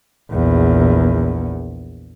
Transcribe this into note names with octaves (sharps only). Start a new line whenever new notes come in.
A#1 E2